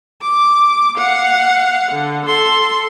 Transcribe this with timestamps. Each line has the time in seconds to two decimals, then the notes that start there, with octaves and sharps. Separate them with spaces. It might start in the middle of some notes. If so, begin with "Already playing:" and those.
0.23 D6
0.98 F5 F#5
1.92 D3
2.26 A4 C6